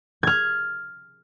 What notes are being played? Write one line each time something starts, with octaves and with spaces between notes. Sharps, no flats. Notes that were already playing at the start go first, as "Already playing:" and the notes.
F6 G#6